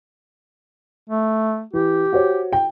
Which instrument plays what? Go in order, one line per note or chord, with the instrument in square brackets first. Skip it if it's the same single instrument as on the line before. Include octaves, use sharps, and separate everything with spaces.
[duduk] A3
[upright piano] E3 [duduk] G4
[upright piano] F#4 C5 C#5
G5